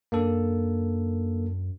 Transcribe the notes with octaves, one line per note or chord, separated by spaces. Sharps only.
F#2 A#3 D4 A4